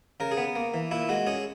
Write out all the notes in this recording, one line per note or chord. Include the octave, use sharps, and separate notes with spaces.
C#3 A#4
G#4
B3
A#3
E3
A#2 E4
G#3 F#4
C#4 G#4